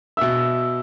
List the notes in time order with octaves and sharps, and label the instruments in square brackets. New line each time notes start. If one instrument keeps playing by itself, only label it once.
[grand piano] B2 [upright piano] E5 E6